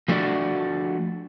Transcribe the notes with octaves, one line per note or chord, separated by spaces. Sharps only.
F3 A3 D4 F#4 D5